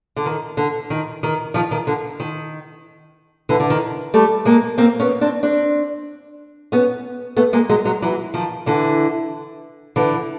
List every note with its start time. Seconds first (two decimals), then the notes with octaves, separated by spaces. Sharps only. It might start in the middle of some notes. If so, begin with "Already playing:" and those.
0.16 D3
0.26 D#3
0.57 D3
0.90 D#3
1.23 D#3
1.54 D#3 F3
1.71 D#3
1.87 D3
2.20 D#3
3.49 D3 E3
3.60 D3
3.70 D#3
4.14 G3 A3
4.45 G#3 A#3
4.78 A#3 C4
5.00 B3 C#4
5.21 C4 D4
5.43 C4 D4
6.72 B3 C#4
7.37 A3 B3
7.53 G#3 A#3
7.69 F#3 G#3
7.85 F#3 G#3
8.02 E3 F#3
8.34 D#3 F3
8.66 D3 E3
9.96 D3 E3